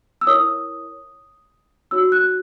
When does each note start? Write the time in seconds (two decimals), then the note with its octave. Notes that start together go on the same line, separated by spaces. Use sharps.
0.21 E6
0.27 E4 A#4 C#5 D#6
1.91 D#4 F#4 C#5 E6
2.12 F#6